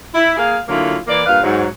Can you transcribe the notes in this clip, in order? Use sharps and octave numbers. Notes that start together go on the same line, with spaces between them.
E4
A#3 G#4 F5
D3 F#3 A#3 C#4 E4 F4
E3 A#3 D5
G2 A#2 B4 F5
G#2 F#3